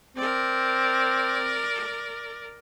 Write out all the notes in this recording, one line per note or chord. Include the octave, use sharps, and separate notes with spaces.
C4 A#4 D5